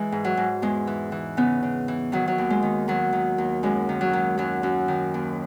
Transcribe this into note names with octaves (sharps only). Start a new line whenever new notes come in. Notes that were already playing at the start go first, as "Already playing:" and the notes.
Already playing: E3 G#3
G#2
F#3
G#2
E2 G#3
E3
E3
C#3 B3
C#3
E3
D#3 F#3
F#3
D#2
G#3
D#3
D#3 F#3
D#3
D#2
F#2 G#3
D#3
F#3
D#3
F#2 F#3
F#2
D#3
D#2